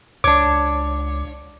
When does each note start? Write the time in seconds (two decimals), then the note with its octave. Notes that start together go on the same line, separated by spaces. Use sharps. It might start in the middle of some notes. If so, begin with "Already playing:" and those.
0.24 C#2 D4 C#5 D6